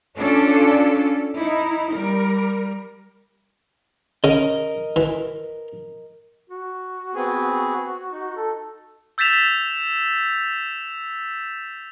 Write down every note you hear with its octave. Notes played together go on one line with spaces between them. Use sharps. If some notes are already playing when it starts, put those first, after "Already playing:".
C#4 D4 F4 A4 D5
D#4 E4
G3 A#4
C#3 A#4 D#5
E3
F#4
B3 C4 G#4
D#4
A4
E6 G6 A6 B6 E7 F7